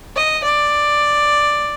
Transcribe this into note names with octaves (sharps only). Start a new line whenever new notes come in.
D#5
D5